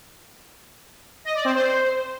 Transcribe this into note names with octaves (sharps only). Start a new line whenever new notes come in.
D#5
D5
C4
C5